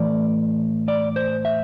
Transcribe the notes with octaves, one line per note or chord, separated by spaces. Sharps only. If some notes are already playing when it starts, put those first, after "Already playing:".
Already playing: A2 E3 A3 D5
D5
C5
E5